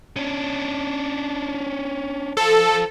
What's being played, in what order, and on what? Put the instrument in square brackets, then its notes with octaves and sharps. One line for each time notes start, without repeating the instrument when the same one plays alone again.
[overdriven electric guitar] C#4 D4
[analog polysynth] A4 [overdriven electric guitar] C5 F5